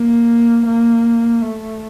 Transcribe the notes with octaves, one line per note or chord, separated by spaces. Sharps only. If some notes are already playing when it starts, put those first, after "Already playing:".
Already playing: A#3
A#3
A3